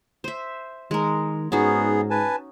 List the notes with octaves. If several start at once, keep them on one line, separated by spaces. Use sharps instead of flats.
C5 E5
D#3 G#3 A#4
G#2 B3 C#4 D#4 F#4 G#4
B4 G#5 A5